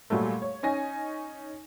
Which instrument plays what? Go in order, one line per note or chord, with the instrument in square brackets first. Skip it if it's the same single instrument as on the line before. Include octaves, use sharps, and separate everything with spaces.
[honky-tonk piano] A#2 F#3 G3 A3
C#5
C#4 D#4 G#5 A#6